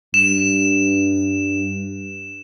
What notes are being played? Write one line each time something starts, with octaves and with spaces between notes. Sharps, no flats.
G2 E7